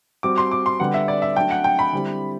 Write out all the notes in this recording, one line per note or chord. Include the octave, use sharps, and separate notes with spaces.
G3 C4 F#4 D6
C6
D6
C6
D3 G3 B3 F#5
E5
D5
E5
F#3 A3 D4 G5
F#5
G5
B5
D3 G3 C4 E4 G4